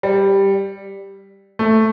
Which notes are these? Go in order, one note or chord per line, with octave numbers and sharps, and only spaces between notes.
G3
A3